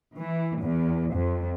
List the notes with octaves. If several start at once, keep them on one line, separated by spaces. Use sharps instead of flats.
E3
E2
F2